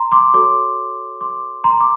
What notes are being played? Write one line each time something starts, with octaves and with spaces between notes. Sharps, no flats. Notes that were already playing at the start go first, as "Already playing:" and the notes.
Already playing: A#5 C6
C6 D6
F#4 A4 C#5 C6 D6
C6 D6
A#5 C6
D6